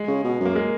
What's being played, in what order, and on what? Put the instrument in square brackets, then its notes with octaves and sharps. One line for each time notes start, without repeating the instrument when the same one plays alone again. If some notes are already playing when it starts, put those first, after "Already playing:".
Already playing: [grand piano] G#3
[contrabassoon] C#3
B2
F#2
[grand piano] A#3
G#3